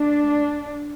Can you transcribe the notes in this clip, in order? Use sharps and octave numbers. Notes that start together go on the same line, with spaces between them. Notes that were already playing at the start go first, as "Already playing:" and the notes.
Already playing: A3 D4